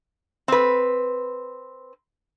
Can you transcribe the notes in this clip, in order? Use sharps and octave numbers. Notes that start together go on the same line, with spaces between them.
C4 B4